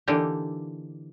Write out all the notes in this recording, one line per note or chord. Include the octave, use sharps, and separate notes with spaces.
D3 E3 A#3 D4 D#4 G4